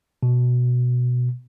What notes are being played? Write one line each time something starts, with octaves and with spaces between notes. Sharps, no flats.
B2